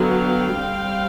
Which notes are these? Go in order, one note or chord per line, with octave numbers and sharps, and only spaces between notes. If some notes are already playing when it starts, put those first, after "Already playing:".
Already playing: D3 F#3 B3 F5 G5
G3 C4